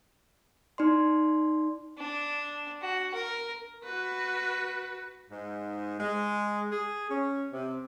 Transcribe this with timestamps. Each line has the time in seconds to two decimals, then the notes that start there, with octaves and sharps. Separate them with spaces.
0.78 D#4 D5 C6
1.98 D4
2.81 F#4
3.14 A#4
3.84 F#4 B4
5.30 G#2
5.99 G#3
6.71 G#4
7.10 C#4
7.52 C3